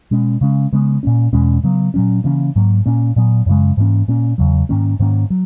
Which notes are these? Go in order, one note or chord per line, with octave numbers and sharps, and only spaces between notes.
B2 G#3 C#4
C#3 G#3 C#4
C#3 G#3 B3
A#2 A#3 C#4
E2 B2 G#3 C#4
C#3 F#3 B3
A#2 F#3 C#4
C#3 E3 A#3 C#4
G#2 F#3 A#3
A#2 A#3 C#4
A#2 F#3 B3
F#2 C#3 G#3
G#2 E3 A#3 C#4
A#2 A#3 C#4
E2 C#3 F#3
G#2 D#3 A#3 C#4
G#2 D#3 A#3 C#4
F#3